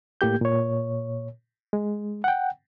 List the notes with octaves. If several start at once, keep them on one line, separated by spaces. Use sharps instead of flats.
A2 A#3 G4 G6
A#2 C#5
G#3
F#5 G5